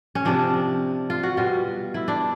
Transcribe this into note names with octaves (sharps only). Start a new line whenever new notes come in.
C#4
C3 F3 D4
F4
F#4
B2 G3 F4
E4
D4